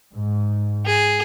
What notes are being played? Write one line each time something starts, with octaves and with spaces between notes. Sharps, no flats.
G#2
G#4